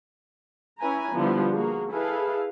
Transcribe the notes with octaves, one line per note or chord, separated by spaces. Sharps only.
C#4 E4 B4 G#5 A#5
D3 F3 G3 B3 D4 E4
A#3 F#4 G#4
E4 G#4 A4 B4 F5